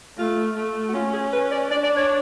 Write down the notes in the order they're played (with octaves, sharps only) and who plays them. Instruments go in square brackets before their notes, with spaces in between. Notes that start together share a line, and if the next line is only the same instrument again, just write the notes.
[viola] A3 [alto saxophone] F4
[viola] A3
[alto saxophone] F#4
[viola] C#4 [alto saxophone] F4
[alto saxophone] G#4
B4
D5
[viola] D4 [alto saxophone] D5
[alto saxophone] D5
C#5